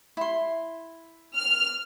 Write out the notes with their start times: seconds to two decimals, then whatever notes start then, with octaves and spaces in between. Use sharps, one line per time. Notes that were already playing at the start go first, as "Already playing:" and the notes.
0.17 E4 C6
1.35 F6